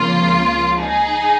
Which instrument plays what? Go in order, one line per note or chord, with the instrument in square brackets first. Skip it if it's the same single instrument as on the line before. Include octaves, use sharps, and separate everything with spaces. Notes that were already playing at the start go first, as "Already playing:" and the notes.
Already playing: [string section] C#2 C#3 F3 A#3 F4
D#4 G#4